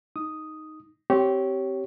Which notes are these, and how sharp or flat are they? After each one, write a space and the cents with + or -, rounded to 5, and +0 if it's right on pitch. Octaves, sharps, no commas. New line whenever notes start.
D#4 +0 D#6 +0
C4 +0 G4 -20 C#5 +0